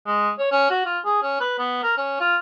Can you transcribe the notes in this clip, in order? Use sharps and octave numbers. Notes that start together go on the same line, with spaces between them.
G#3
C#5
C#4
F#4
F4
G#4
C#4
B4
B3
A#4
C#4
F4